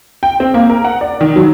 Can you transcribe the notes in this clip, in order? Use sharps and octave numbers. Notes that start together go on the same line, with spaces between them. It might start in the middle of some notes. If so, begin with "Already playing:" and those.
G5
C4
A#3
A#4
F#5
D5
D#3
F#3